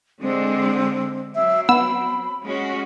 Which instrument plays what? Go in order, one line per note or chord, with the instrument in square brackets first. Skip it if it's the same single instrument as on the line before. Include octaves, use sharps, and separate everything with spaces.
[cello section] D3 G#3 D4 [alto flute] C4
[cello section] F#3 C4 [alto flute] E5
[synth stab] B3 E6 [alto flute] B5
[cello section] G#3 C#4 F#4